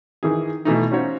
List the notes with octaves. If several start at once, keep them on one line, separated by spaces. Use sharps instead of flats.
D#3 E3 G#4
B2 E3 A3 D#4
C#4 D#4 F4 F#4 C5 C#5